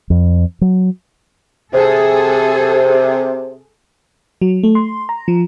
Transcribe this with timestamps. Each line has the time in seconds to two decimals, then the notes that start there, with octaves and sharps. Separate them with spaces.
0.10 F2
0.61 F#3
1.73 C3 G#4 A4
4.42 F#3
4.63 A3
4.75 C6
5.09 A#5
5.28 F3